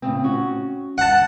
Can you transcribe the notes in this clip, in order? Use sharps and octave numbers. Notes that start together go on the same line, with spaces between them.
A2 C#3 C4
C#4 F#4
F#5 A5